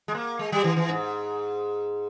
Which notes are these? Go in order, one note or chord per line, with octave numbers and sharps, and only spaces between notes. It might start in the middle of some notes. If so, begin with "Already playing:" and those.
G#3
A#3
G#3
G3
E3
E3
G#2